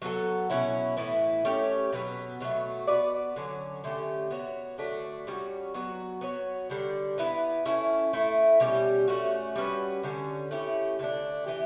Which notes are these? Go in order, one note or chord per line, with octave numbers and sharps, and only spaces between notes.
F#3 B3 F#4 A4
B2 F#3 C#4 E4
A2 E3 B3 E4
A3 C#4 G4 C#5
B2 F#3 B3
B2 F#3 A3
B3 F#4 B4 D5
D3 F#3 C#4
D3 A3 C#4 G4
B3 F#4 C#5
D3 F#3 A3 D4
G3 C#4 F#4
F#3 B3 F#4
B3 F#4 C#5
D3 G3 D4
B3 E4 B4
A3 C#4 E4
A3 E4 A4
B2 G3 C#4 G4
A3 C#4 F#4
G3 C#4 F#4 B4
D3 G3 C#4
A3 C#4 E4 G4
D3 A3 D4
E3 B3 E4 G4